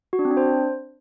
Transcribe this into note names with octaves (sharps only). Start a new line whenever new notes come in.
F#4
D4
C4
D4
C5